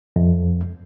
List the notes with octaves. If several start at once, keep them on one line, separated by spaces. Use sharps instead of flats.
F2